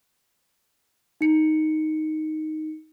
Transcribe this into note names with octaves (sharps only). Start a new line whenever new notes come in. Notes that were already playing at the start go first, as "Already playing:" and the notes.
D#4 C#7